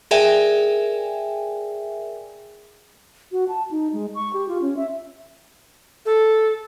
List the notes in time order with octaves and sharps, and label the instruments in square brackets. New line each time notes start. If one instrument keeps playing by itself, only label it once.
[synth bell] G#4 A#4 D5 E5 G5 G#5
[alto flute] F#4
A5
D#4
G#3
C#6
G4
F4
C#4
E5
[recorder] A4